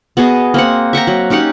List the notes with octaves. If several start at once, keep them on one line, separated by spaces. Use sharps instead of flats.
B3 F#4 G#4 D#5
A#3 C4 F#5
E5 F#5 G5 A#5
F#3
C#4 D#4 G4 F#5